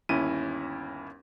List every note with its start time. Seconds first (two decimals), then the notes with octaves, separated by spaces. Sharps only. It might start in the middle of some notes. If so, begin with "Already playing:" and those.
0.09 G1 D#2 C#4 E4 D#7